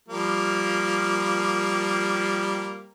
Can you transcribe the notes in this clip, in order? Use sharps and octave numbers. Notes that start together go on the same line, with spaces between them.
F3 G3 A#3